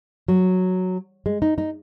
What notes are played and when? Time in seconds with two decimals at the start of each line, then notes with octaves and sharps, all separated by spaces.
0.28 F#3
1.26 G#3
1.42 D#4
1.58 D#4